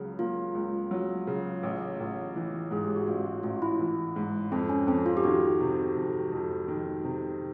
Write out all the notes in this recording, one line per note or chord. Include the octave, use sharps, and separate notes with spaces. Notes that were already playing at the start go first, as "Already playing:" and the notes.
Already playing: C#2 C#3 F#3
A#3 F4
C#2
F#3
C#3
A1
A1
E3
G#2 G#4
G4
F#4
A1 F4
F#4
A1 F4
E4
E3
G#2
F2 C4
C#4
F2 C4
F4
G4
D#3 F#4
C3
F2
F2
D#3
C3